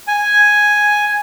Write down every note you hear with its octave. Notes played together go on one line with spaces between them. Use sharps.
G#5